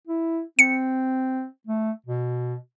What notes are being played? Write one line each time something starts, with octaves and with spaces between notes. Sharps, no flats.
E4
C4 C#7
A3
B2